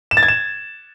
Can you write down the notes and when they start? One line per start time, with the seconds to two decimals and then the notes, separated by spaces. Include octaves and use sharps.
0.11 E7
0.17 A6
0.23 G#6
0.28 E7